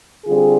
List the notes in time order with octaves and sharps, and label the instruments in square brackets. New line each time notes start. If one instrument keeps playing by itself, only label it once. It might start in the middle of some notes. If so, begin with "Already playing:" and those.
[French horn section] D3 G3 C4 F4 G#4